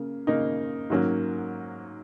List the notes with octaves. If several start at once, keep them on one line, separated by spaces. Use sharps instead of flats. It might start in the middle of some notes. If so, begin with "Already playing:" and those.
Already playing: C#3 A#3
C#3 A#3 D#4
G#2 F#3 A#3 C#4